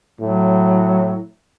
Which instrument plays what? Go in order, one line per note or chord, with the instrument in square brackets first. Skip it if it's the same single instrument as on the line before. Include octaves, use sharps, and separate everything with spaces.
[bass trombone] A2 [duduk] F#3